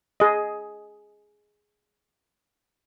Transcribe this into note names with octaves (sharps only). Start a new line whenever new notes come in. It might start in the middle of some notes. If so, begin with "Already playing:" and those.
G#4 D#5